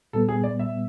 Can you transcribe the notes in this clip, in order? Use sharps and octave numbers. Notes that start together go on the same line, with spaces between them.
A#2 G3 B3 A4
G#4
D5
E5